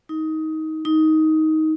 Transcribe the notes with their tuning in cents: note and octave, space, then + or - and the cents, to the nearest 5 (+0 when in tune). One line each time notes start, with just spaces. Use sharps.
D#4 +20
D#4 +15